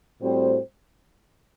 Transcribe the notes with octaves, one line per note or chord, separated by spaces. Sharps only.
A2 G3 C4 F#4 C5